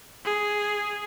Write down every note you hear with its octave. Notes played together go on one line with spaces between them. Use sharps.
G#4